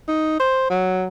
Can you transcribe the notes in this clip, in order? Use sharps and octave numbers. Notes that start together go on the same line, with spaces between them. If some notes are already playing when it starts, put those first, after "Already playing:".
D#4
C5
F#3